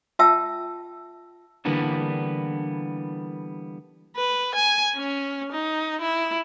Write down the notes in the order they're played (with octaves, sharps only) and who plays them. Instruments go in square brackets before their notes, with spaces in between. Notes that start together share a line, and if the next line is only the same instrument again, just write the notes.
[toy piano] F4 E5 G5 A5 E6
[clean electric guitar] D3 E3 G3 A#3 B3 D4
[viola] B4
G#5
C#4
D#4
E4